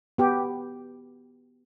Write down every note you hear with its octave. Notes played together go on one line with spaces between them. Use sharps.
B3 G4